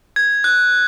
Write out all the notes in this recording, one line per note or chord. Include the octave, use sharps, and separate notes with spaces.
G#6
F#6